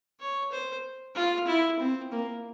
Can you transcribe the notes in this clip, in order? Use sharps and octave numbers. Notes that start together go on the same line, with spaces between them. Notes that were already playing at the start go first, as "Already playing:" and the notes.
C#5
C5
F4
E4
C4
A#3